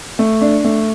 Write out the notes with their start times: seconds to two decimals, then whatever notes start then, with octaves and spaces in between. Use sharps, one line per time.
0.19 A3
0.41 D4
0.65 A3